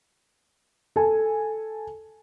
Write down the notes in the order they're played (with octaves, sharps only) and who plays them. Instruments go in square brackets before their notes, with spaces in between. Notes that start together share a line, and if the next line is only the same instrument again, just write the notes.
[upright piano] A4 G#5